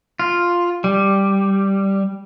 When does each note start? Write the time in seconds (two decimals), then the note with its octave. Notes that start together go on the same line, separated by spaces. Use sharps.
0.19 F4
0.84 G3